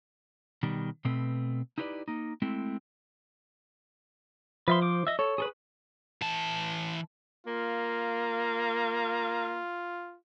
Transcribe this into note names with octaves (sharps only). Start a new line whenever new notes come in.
B2 D#3 G3
B2 A3 C4 B4
D#4 E4 G4 B4 C#5 D5
A#3 D#4
G#3 A3 C4 E4
F3 B4 E5 C6
C5 D6
D#5 E5
A4 C#5
G#4 A4 B4
E3 A5
A#3 F4